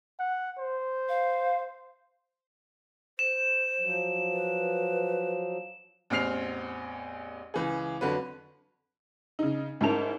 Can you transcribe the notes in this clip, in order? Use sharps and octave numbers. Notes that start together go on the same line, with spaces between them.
F#5
C5
F5
C5 E7
F3 F#3
B4
A1 E2 C4 F6 C7 F7
C#2 E3 G#4
F2 D3 F#3 B4
C#3 D#4
G#2 C#4 E4 A#4 A5 F7